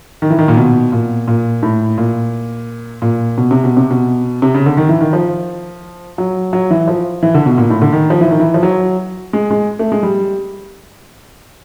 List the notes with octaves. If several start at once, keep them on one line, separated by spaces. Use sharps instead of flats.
D#3
E3
D#3
A#2
B2
A#2
A#2
A2
A#2
A#2
B2
C3
B2
C3
B2
C3
C#3
D3
D#3
E3
D#3
F3
F#3
F#3
E3
F3
E3
D3
B2
A#2
A2
D3
D#3
F3
E3
D#3
E3
F3
F#3
G#3
G#3
A3
G#3
G3